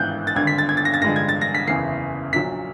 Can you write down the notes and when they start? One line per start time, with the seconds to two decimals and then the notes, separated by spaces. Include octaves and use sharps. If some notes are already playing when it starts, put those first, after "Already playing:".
Already playing: G#1 G#2 E3 F#6 G6
0.27 A6
0.36 G#1 G2 D3 G#6
0.47 B6
0.58 A6
0.69 G#6
0.77 A6
0.85 A#6
0.94 A6
1.02 A1 G2 D3 F3 G#3 A#6
1.16 G#6
1.29 A6
1.41 A#6
1.55 B6
1.67 F#1 E2 C#3 E3 C7
2.33 A#1 A#2 F#3 B6